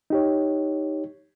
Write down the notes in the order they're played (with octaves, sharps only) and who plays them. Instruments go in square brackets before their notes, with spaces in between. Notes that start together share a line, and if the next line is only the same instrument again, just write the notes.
[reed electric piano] D#4 G4 C#5